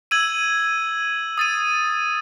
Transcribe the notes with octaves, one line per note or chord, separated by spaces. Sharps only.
E6 G#6 D#7 F#7
D#6 A6 D#7